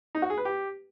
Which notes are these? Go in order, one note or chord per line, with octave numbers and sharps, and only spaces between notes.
D#4
F#4
G#4
B4
G4